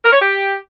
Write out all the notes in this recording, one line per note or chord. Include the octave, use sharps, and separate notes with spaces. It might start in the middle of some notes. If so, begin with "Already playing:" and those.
A#4
C#5
G4